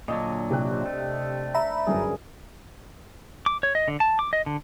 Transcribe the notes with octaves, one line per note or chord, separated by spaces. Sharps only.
A#2 D3 F#3 D4 D5 D#5
C3 G5 F#6
C5
A3
E5 A#5 B5
G1 F#2 F#3 G#4 A#4
D6
C#5
D#5
D3
A5
D6
D#5
D3